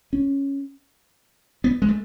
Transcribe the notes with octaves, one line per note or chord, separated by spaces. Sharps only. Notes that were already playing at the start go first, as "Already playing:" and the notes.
C#4
B3
G#3
A3